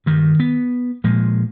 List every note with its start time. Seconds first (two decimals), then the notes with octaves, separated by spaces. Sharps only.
0.06 G2 D#3
0.39 B3
1.04 A#2 F3 G#3